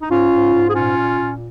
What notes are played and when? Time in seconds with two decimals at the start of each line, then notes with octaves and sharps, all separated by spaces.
0.02 D#4
0.10 G#2 C#4 F4
0.32 G#2
0.54 G#2
0.68 G#4
0.75 A#2 C#4 F4
0.97 A#2
1.19 A#2